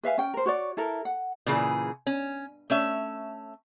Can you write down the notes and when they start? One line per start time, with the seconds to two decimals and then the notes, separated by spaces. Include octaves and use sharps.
0.04 B4 E5 F5 G#5
0.18 C#4 G5
0.34 A#4 C5
0.46 F#4 C#5 D5
0.77 E4 A4 A#4
1.05 F#5
1.46 A#2 C#3 E3 G#4
2.07 C#4
2.70 A3 C#4 E5